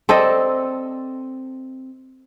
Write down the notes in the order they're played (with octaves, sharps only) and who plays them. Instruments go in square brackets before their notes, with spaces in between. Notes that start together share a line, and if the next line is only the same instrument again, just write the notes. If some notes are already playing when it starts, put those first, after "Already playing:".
[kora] C4 A4 D5 D#5